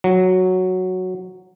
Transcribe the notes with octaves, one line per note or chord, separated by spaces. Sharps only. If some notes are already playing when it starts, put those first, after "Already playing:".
F#3